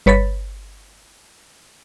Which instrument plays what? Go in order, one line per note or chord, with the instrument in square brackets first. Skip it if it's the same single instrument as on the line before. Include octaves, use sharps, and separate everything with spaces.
[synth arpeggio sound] G1 B4 C#5 B5 A6 B6